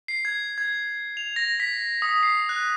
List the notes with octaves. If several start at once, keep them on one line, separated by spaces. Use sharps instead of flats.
C7
G#6
G#6
F7
A#6
B6
D#6
C7
F#6